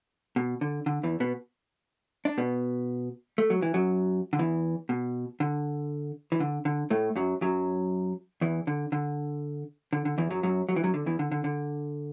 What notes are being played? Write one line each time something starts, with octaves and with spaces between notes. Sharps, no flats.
B2
D3
D3
E2 E3
B2 B3
D4
B2 B3
A3
F#3
E3
F#2 F#3
D3
E2 E3
B2
D3
E3
D3
D3
A2 A3
F#2 F#3
F#2 F#3
E2 E3
D3
D3
D3
D3
E2 E3
F#2 F#3
F#2 F#3
F#3
E3
F#2 F#3
D3
E2 E3
D3
D3
D3